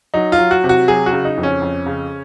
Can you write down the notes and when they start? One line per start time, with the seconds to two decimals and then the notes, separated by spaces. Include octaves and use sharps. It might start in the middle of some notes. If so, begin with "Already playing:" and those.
0.14 F#3 D#4
0.32 F4
0.38 F#3
0.51 F#4
0.64 C3
0.69 F#4
0.88 F#3 G#4
1.06 F#4
1.13 C#3
1.25 D#4
1.38 F2
1.43 C#4
1.62 F2
1.86 C#3